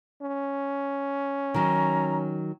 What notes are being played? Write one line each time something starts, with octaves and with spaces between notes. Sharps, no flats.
C#4
D#3 F#3 A#5